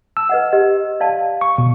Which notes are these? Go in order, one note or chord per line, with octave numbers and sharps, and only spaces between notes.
A5 E6
B4 D#5 F#5
G4 D#5
D5 F5 A5
C#6
B2